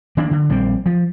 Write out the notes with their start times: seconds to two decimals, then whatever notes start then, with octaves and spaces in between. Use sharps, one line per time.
0.17 D#3 A#3 D4
0.31 D3
0.49 A#1 G3 A#3 C4
0.86 F3